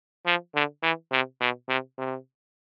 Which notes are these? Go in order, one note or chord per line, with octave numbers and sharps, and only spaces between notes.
F3
D3
E3
C3
B2
C3
C3